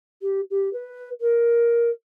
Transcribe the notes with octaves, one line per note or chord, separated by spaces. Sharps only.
G4
G4
B4
A#4